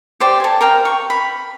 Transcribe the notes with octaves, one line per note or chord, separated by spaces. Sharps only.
G4 C5 D5 G5
A4 G#5
A#4 F5 G5
C#6
B5